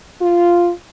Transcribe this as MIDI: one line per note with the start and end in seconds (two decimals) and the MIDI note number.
0.21 0.70 65